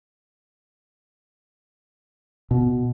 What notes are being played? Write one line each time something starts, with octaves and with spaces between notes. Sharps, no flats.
B2